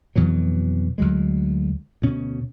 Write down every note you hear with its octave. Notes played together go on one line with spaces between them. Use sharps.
F2 B2 E3 F#3
D2 F#3 G#3
D2 B2 C#4